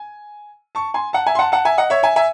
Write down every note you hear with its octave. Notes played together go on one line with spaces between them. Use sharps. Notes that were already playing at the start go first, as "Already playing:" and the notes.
Already playing: G#5
A5 C#6
G#5 C6
F#5 A5
E5 G#5
C6
F#5 A5
F#5 A5
E5 G#5
D#5 F#5
C#5 E5
E5 G#5
E5 G#5